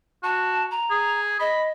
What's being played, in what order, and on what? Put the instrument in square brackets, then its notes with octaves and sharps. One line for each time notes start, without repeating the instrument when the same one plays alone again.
[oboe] F#4 [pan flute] A5
[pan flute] A#5
[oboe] G#4
[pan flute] D#5 [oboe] B5